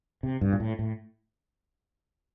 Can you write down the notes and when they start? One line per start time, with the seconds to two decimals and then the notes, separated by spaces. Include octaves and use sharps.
0.23 C3
0.41 G2
0.53 A#2
0.60 A2
0.79 A2